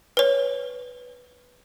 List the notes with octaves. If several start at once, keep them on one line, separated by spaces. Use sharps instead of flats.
B4 C#5